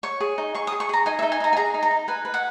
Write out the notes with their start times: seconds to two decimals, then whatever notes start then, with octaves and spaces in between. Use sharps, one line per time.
0.03 C#5 C#6
0.20 G#4
0.38 D#4
0.55 G#4 C#6
0.67 D#6
0.72 G#4
0.80 C#6
0.89 G#4 A#5
1.06 D#4 G#5
1.19 E5
1.22 D#4
1.32 G#5
1.40 D#4 A#5
1.53 G#5
1.57 G#4 A#5
1.74 D#4
1.83 A#5
1.91 D#4
2.08 B4 G#5
2.25 B4
2.34 F#5